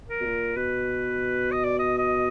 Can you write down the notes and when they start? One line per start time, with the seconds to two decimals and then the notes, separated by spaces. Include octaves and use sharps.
0.09 A#4
0.20 B2
0.26 A#2
0.56 B2 B4
1.52 D#5
1.64 D5
1.79 D#5
1.98 D#5